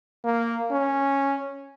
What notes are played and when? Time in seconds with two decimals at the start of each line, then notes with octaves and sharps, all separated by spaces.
0.24 A#3
0.71 C#4